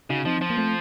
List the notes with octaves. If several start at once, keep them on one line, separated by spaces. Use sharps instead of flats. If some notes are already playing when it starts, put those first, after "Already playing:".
C#3 D#4 F#4
F3 C4 D#4
F3
A#3
A3 C4